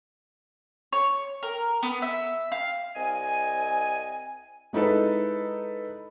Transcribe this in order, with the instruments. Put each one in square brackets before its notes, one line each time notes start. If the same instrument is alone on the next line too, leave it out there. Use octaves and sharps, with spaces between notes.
[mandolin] C#5
A#4
B3
E5
F5
[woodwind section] C2 C4 D#5 G#5
[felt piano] G#3 D#4 E4 A4 B4